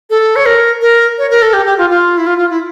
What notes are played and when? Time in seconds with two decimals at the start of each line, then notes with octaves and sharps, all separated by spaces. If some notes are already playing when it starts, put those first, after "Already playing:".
0.10 A4
0.36 C#5
0.46 A#4
0.81 A#4
1.18 C#5
1.30 A#4
1.42 A4
1.53 G4
1.66 G4
1.78 F4
1.90 F4
2.18 E4
2.27 F4
2.38 F4
2.50 E4